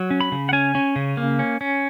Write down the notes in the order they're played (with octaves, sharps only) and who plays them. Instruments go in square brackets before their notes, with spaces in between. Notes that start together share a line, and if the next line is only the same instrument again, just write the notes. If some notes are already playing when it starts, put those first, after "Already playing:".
Already playing: [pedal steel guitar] F#3
C#4
B5
C#3
F#5
C#4 G#5
C#4
C#3
A#3
C#4
C#4